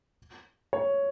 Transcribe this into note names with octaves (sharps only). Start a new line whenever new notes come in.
C#5